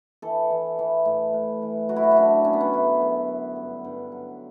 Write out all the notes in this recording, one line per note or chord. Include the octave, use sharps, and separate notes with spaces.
E3 A4
E3
E3
A2
A2
E3
F#3 F#4
E4
F#4
E4
F#2 D4
F#3 C#4
B3
C#4
D3 E4
F#2
F#2
G2
G2
F#3